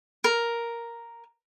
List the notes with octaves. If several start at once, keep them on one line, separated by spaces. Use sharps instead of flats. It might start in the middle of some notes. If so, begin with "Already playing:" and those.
A#4